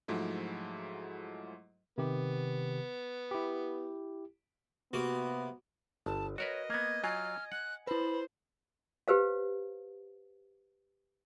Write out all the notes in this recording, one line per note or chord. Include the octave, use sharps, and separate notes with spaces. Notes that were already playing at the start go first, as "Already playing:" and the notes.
G#2 F3 F#3 G#3 A3 E4
C3 D#3 B3 G4
E4 G4
C3 A#3 B3 F#4
G1 A5
F#4 A#4 B4 C#5 D#5
A#3 B3 G#6
F#3 F4 G#5 F6 G#6
F#5 F#6
E4 B4 C5 B5
G4 B4 C5 F5